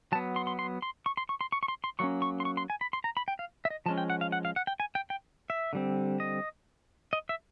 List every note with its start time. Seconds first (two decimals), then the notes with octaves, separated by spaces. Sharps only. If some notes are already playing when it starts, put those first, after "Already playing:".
0.12 F#3 A5
0.15 B3
0.36 C6
0.47 C6
0.59 C6
0.82 C6
1.06 C#6
1.17 C6
1.29 C#6
1.41 C6
1.52 C#6
1.63 C#6
1.68 C6
1.84 C6
1.99 F#3 A#3 C#4 C#6
2.22 C#6
2.40 C6
2.45 C#6
2.57 C6
2.70 G#5
2.81 B5
2.93 C6
3.04 A#5
3.17 B5
3.28 G5
3.39 F5
3.65 E5
3.70 D#5
3.86 F3 G#3 C#4 A5
3.98 G5
4.10 F#5
4.21 F5
4.32 F#5
4.45 F5
4.56 F#5
4.67 G5
4.80 G#5
4.95 G5
5.10 G5
5.50 E5
5.73 D3 G3 C4
6.20 D#5
7.13 D#5
7.29 E5